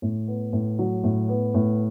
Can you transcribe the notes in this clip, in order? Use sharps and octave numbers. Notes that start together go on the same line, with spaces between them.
A2
B3
A2
F#3
A2
B3
A2